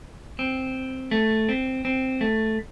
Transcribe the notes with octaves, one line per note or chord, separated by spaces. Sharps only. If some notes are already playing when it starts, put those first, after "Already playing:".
C4
A3
C4
C4
A3